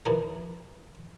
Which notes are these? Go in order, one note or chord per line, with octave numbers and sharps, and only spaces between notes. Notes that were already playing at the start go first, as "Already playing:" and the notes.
D#2 E3 F3 A#3 B3 C5